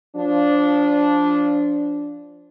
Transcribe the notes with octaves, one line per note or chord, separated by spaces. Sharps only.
F3 D4